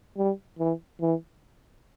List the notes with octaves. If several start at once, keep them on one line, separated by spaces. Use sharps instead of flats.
G3
E3
E3